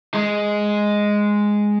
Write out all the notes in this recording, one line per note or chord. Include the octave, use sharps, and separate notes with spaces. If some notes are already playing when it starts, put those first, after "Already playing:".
G#3